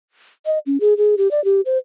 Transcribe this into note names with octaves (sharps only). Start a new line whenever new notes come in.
D#5
C#4
G#4
G#4
G4
D5
G4
C5